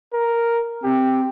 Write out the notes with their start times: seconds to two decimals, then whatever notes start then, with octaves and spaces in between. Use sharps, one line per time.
0.13 A#4
0.84 C4 G4